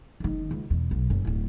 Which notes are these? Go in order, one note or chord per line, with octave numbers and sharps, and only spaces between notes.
F#1 D#3
C#2
E2 B2
B1
F#1 F#2
D1 A2